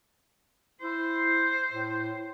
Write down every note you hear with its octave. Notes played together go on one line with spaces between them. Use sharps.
E4 C5
A2